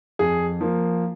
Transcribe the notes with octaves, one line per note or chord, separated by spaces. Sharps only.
F2 G#4
F3 A#3